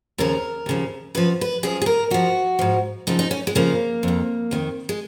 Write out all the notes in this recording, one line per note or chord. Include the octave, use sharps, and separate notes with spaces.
D#2 C#3 F3 A#4
D#2 C#3 F3
F#2 F3 B4
B4
F#2 F3 G#4
G#4
A#4
G#2 F3 F#4
G#2 F3
F#2 C#3 F3 D#4
D#4
C#4
G#3
F#2 C#3 F3 A#3
F2 D#3
F2 D#3
G#3